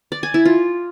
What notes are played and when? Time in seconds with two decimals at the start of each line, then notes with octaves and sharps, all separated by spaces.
0.12 D5
0.23 G#5
0.34 E4
0.45 F4